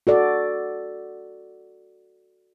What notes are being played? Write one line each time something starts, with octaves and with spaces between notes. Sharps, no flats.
F#4 A4 D5